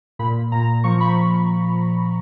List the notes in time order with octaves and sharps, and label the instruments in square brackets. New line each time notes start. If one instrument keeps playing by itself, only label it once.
[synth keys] A#2 B5
A#2 A#5
F3 C#6
B5